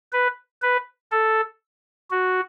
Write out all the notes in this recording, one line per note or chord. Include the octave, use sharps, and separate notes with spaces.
B4
B4
A4
F#4